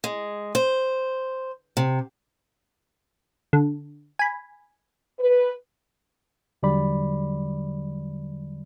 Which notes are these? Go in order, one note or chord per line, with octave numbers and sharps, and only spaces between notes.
G#3
C5
C3
D3
G#5 B5
B4
E2 D3 F#3 G3 D5 B5